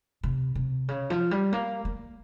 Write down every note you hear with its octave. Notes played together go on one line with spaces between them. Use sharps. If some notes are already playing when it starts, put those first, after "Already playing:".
C3
C3
C#3
F3
G3
A#3
A#3